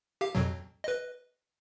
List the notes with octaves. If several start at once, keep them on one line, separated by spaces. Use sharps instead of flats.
G4 F5
F2 B2 F#3
B4 D#5